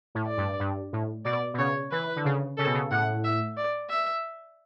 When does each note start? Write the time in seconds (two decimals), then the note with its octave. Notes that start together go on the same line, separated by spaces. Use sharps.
0.15 A2
0.26 D5
0.37 G2
0.60 G2
0.93 A2
1.25 B2 D5
1.54 B2
1.58 C#3 C#5
1.92 E3 B4
2.16 D3
2.25 C#3
2.57 C#3 A4
2.66 B2
2.74 C#3
2.91 A2 F#5
3.24 E5
3.57 D5
3.90 E5